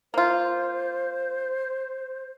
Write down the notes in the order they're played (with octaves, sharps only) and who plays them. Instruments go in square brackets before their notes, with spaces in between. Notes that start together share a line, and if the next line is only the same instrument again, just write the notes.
[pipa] A#3 F4 [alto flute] C5